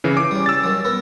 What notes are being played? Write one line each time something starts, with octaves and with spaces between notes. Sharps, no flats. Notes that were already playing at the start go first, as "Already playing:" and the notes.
C#3 E3
D6
G3 C#4
E6 A6
D#3 F#3
B3 A#4